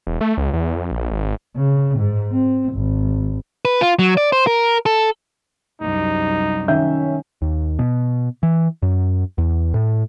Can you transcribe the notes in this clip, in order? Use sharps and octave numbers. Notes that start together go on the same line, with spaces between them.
E1
A3
C#2
E2
F2
A#1
G#1
C#3
G#2
C4
G#1
B4
F4
F#3
D5
C5
A#4
A4
C2 F#2 D#4
D#3 C#4 E5 G6
D#2
B2
E3
F#2
E2
A2